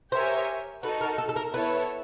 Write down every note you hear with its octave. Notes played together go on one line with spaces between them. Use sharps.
G4 A#4 C5 C#5 E5 G#5
D#4 F#4 A4 B4
A#4
A4
A4
A#4
B3 E4 A4 B4 C#5